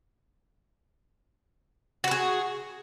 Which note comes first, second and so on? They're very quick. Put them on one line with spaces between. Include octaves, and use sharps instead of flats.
F#4 B4 G#4